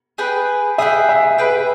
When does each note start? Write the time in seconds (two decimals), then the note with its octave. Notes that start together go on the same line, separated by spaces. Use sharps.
0.18 G#4 B4 G5
0.78 G#4 B4 E5 G5
1.09 E5
1.38 G#4 B4 G5